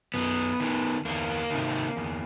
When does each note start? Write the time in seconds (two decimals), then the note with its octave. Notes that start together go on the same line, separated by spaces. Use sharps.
0.14 F#2 B3
0.60 D#3
1.05 E2 A#3
1.50 C3 D#3
1.96 E2